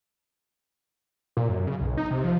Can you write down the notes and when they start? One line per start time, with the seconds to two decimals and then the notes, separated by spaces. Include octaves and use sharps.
1.37 A#2
1.49 F#2
1.67 C#3
1.80 B1
1.97 D#4
2.11 C3
2.24 F3